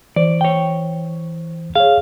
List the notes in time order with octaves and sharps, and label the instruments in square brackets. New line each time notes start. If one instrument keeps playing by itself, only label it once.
[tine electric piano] E3 C5 [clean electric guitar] D5
[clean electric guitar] C#5 G5
[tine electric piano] G#4 C#5 [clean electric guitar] F5